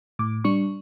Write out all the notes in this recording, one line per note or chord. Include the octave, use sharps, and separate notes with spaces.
A2 D6
G3 D4 C#6